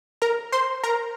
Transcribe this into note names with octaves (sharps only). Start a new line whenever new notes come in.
A#4 A#5
C5 C6
A#4 A#5